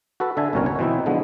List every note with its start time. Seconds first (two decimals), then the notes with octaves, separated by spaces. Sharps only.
0.20 F#4 A4 B4
0.37 D3 E5 G#5 A5
0.53 G1 C2 B2 C#4 A#4 C#5
0.66 C#5
0.79 B2 E3 C4 D#4 E4
1.06 D3 F3 G#3 B3